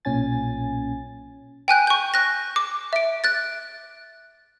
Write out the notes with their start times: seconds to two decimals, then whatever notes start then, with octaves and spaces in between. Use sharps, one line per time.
0.05 B1 A#2 C#4 G#5 A6
1.68 G5 G#5 F#6 G6
1.87 C#6 G6
2.14 F#6 A#6
2.56 D6
2.93 E5 D7
3.24 F#6 A6